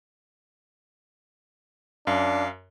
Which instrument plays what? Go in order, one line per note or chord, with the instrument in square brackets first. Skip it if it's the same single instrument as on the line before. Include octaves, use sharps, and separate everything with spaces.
[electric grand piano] F#2 [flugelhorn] D4 [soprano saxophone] F5